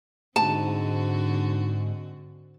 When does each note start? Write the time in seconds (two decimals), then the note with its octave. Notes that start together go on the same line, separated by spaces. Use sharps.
0.36 G#2 D3 C4 F#4 A5